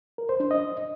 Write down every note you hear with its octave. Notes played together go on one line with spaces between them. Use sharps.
A#4
C5
D4
D#5